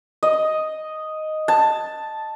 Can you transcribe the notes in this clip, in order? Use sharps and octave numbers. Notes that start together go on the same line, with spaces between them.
D#5
A5